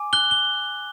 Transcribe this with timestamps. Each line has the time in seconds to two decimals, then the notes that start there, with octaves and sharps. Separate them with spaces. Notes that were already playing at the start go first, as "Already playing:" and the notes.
Already playing: G#5 D6
0.13 F#6 G7
0.31 G7